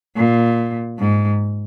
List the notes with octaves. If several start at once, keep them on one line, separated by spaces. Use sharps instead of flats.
A#2
G#2